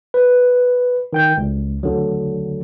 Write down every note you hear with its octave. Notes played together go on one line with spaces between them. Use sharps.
B4
D#3 G5 G6
C#2
D2 D3 F#3